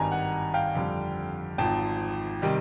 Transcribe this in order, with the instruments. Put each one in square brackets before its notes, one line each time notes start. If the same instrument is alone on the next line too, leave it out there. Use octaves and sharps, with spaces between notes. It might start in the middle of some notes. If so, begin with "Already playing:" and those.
Already playing: [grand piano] G#1 G2 D#3 G3 G#5 A#5
F#5
F5 G5
F2 D3 G3
G#1 G#2 F3 G5 A5
C3 D#3 G3